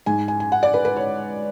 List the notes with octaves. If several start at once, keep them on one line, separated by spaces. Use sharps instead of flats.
G#2 G#5
G#5
G#5
F#5
D5
B4
B4
C#5